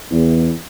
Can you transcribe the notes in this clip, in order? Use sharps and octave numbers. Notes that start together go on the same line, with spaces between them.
E2